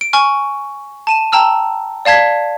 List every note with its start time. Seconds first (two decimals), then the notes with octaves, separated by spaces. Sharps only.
0.01 D7
0.13 G#5 C#6 F6
1.07 A5 D#7 E7
1.32 G5 A5 A#5 E6 F6
2.05 D5 F5 A5 G#6 B6